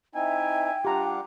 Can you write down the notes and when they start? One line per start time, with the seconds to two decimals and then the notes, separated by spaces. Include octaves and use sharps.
0.15 C4 D#4 E4 E5 G5 G#5
0.85 G3 D4 F4 G4 F#5 A#5 D6